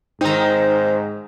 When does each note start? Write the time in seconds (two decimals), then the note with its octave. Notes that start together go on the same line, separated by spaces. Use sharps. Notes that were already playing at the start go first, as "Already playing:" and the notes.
0.21 G#2 D#3 C4 D#4 A#5